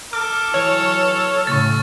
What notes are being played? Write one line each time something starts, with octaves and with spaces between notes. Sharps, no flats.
A4 D6 F6
E3 F#3 C#5
A2 C#3 C#6 A6